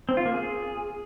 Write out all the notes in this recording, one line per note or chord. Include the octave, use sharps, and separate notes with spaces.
C4
F4
A#3
G#4